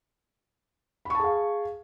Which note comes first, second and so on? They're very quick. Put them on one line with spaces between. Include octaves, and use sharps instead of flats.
B5 C#6 A5 G#4 F5